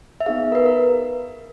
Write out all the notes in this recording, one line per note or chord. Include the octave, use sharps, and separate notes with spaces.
E5
B3 D#4 G#4 F5
A#4
B4
A#4